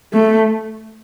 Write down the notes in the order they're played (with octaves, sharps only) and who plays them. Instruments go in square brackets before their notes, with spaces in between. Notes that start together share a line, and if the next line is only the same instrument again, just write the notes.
[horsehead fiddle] A3